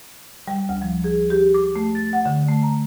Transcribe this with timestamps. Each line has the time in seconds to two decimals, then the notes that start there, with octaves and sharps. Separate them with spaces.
0.48 G3
0.69 D2
0.82 F3
1.04 G#4
1.30 G4
1.54 D6
1.76 A3
1.95 A6
2.13 F#5
2.26 D3
2.49 A3
2.63 A#5